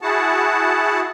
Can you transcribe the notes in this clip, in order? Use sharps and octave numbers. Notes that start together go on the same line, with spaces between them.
E4 F#4 G#4 F#5 A5